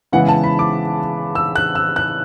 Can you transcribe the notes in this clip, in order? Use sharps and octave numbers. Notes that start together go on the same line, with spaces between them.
C#3 E3 G#3 B3 F#5
A5
B5
D6
E6
F#6
E6
F#6